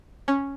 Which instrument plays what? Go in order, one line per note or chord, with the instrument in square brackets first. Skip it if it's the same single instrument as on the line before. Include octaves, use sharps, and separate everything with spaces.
[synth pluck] C#4